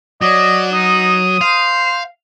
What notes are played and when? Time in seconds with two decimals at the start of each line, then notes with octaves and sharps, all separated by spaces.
0.22 F#3 D5 D#5
0.73 D#4 D#6
1.41 C5 F5